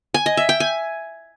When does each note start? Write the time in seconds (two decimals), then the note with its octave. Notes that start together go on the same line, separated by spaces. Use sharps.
0.14 G#5
0.26 D#5
0.37 E5
0.49 G5
0.60 G#5